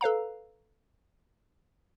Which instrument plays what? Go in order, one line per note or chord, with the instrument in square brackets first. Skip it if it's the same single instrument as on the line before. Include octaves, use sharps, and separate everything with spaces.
[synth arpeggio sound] A4 B4 F5 A#5